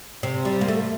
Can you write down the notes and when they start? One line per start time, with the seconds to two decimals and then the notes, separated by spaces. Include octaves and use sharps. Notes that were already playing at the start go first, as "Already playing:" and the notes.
0.23 C3
0.45 G3
0.61 A#3
0.68 A3